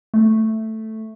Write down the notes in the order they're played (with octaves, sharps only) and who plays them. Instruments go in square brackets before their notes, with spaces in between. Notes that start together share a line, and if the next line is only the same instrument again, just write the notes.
[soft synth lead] A3